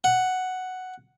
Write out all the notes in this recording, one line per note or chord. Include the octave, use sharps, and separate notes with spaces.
F#5